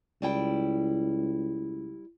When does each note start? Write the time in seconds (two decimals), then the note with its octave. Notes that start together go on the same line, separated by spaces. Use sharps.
0.22 C#2 G3 E4 G5